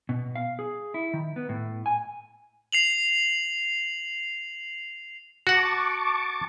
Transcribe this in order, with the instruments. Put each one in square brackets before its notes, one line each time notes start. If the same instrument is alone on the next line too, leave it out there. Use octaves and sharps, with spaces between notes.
[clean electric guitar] B2
F5
G#4
E4
D#3
B3
A2
G#5
[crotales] C7 F7 F#7
[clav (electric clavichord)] F#4 F#5 [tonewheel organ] A5 C#6 D6